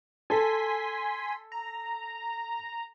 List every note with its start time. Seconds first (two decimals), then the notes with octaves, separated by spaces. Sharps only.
0.30 A4 G#5 C6 B6
1.52 A#5